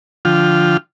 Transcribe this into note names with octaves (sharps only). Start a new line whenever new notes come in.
D3 F3 F4 G5 F6